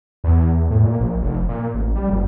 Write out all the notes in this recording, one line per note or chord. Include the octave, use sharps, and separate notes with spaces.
E2
A2
A#2
A#1
F1
A#2
A1
G3
F#1